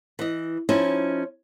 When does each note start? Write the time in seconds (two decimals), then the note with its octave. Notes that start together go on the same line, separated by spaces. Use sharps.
0.19 E3 D#5
0.69 F3 C#4 D#4 E4